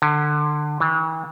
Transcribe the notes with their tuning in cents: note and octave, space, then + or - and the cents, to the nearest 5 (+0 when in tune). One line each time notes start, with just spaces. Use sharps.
D3 +25
E3 -40